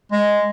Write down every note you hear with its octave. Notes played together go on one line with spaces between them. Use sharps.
G#3